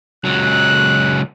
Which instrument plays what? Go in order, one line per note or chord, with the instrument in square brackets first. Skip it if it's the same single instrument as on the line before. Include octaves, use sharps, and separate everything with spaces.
[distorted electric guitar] C#2 F#3 [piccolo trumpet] F#6